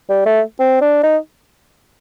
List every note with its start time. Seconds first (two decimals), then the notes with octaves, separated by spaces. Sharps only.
0.09 G3
0.26 A3
0.60 C4
0.82 D4
1.04 D#4